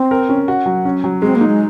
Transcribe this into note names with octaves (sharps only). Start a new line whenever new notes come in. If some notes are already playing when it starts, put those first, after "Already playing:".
Already playing: C4
A#4
C#4
F#4
F#3
C#4
F#3
G#3 C4
A#3
D#4
G#3